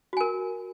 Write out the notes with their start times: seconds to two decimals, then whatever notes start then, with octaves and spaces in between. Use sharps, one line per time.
0.13 F#4
0.17 G#5
0.21 A#4